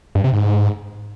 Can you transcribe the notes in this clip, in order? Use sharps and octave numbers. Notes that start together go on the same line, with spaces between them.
G2
C3
G#2